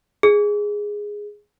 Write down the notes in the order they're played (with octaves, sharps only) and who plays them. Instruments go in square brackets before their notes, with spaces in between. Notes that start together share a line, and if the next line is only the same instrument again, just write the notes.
[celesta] G#4